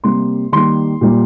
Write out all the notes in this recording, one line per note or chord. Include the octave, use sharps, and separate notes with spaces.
C3 G3 A#3 C6
D#3 G3 A#3 C6
A#2 G3 A#3